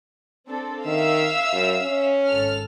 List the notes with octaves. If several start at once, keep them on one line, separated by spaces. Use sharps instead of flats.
C4 D4 A4
D#3 E5 F5 E6
F#2
C#4
G#1 A4 F6